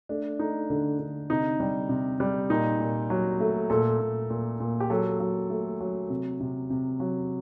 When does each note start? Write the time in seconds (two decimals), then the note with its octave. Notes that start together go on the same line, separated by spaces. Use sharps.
0.09 A3 D4
0.39 A3 D#4
0.70 D3
0.99 D3
1.30 C3 D#4
1.60 G3
1.89 C3
2.20 G3
2.50 A#2 D#4
2.80 A#2
3.10 F#3
3.40 A3
3.70 A#2 A4
4.00 A#2
4.30 A#2
4.60 A#2
4.80 G4
4.90 F#3 A4
5.20 F#3
5.50 A3
5.80 F#3
6.10 C3
6.40 C3
6.70 C3
7.00 F#3